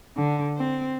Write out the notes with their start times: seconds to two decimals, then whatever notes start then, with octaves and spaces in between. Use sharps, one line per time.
0.17 D3
0.57 C4